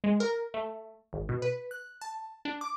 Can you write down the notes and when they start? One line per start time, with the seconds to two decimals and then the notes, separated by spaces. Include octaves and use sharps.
0.04 G#3
0.20 A#4
0.54 A3
1.13 G#1
1.29 B2
1.42 B4
1.71 F#6
2.01 A5
2.45 D4
2.61 D6